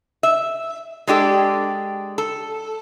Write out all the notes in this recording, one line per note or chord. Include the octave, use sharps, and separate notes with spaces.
E5
G#3 D4 G4 A4
A4